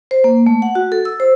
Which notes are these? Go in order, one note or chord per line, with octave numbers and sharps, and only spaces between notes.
C5
A#3
A3
F#5
F#4
A4
E6
C5